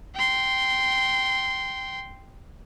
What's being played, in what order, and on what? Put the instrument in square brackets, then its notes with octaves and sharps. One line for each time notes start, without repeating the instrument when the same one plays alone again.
[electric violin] G5 C6